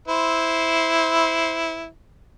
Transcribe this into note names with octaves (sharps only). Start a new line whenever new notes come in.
E4 C5